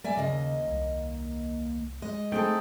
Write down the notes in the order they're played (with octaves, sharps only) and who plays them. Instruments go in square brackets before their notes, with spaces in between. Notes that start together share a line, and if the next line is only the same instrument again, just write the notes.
[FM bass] G3 [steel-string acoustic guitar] D5 E5 G#5
[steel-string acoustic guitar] D#2 A#3 D#5 [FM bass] C#3
[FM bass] C2
[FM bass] G#3 [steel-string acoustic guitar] D#5
[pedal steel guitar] A3 D#4 G5 [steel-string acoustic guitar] C4 G#4 A4